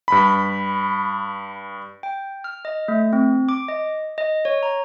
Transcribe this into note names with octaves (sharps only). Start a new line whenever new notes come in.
G2 B5
G5
F6
D#5
A3
C4
D6
D#5
D#5
C#5
A#5